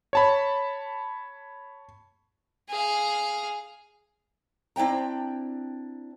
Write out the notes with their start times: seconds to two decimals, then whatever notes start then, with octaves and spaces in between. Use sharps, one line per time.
0.13 C#5 A5 B5
2.69 G#4 F5
4.76 C4 D4 E4 G5 A#5